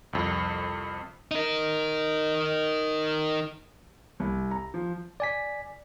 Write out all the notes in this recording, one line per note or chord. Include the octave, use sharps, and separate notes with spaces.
C2 F2
D#4 A#4
C2
A#5
F3
D5 G#5 B6